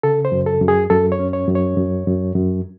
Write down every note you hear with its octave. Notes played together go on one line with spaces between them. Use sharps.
C#3 A4
C5
F#2
A4
F#2
G#4
F#2 A4
C#5
C#4
C#5
F#2
C#5
F#2
F#2
F#2